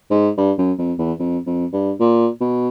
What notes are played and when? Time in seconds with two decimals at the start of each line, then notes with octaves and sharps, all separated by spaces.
0.10 G#2
0.37 G2
0.58 F#2
0.78 F2
0.98 E2
1.19 F2
1.46 F2
1.73 G2
2.00 A#2
2.41 B2